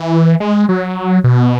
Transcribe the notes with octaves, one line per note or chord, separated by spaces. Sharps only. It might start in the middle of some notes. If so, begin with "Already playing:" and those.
Already playing: E3
G#3
F#3
B2